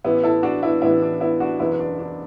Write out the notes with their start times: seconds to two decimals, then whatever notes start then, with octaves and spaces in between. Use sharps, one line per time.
0.04 A1 A2 E3 B3 E4
0.23 E4 A4
0.43 D4 F#4
0.63 B3 E4
0.82 A1 A2 E3 B3 E4
1.02 D4
1.20 B3 E4
1.40 D4 F#4
1.59 F#1 E2 B2 B3 E4
1.79 D4
1.99 D4